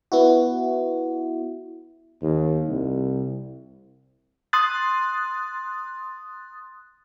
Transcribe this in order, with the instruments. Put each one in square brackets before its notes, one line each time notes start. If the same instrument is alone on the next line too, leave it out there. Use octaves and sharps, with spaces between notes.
[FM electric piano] B3 E4 F#4
[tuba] D#2
C2
[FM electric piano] C6 D#6 F#6 A6